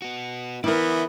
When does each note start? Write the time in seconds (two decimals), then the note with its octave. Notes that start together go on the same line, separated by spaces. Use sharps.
0.02 B3 F#4
0.64 E3 B3 E4 A#4 D5 E5